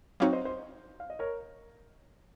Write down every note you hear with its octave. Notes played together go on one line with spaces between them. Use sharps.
F#3 C4 D#4 F#4 C#5 F5
C5 D#5
C5 D#5
F5
D#5
A#4 C#5